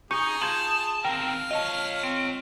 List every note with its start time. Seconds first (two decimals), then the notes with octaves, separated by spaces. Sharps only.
0.11 D#4 G#4 C#6 G6 C#7
0.41 F4 A5 G6 G#6 F#7
1.05 D#3 C4 A#4 F5 G5
1.51 F4 C#5 D#5 A5
2.03 C4